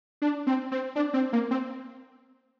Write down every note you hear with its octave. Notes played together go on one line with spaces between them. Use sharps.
D4
C4
C4
D4
C4
A#3
C4